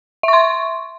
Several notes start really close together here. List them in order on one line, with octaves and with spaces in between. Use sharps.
E5 C#6 C6